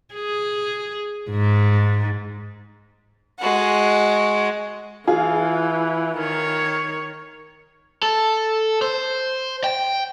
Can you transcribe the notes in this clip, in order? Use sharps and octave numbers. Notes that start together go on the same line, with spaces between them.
G#4
G#2
G#3 F#4
E3 F4 G#4
D#3 C#5
A4
C5
G5